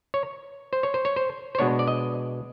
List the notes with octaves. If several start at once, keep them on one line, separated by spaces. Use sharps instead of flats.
C#5
C5
C#5
C5
C#5
C5
C5
B2 G#3 B3 D4 C#5
D5
D#5